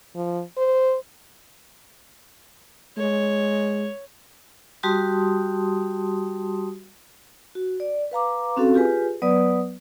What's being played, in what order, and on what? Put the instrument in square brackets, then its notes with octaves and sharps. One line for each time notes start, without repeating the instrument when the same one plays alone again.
[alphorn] F3
C5
[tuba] G#3 [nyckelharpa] C#5
[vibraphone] G3 F#4 G4 A5 C6 D#6
F#4
D5
B4 F5 A#5 D6
C4 C#4 F#4 A4 F5
F4 G4 G#4 B4 G#5
F#3 B3 B4 D5 D#6